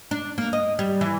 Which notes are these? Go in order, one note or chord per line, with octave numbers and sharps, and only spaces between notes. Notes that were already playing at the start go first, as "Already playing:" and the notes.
D4
A#3
D#5
G3
E3